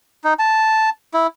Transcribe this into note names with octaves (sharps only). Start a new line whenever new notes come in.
D#4
A5
E4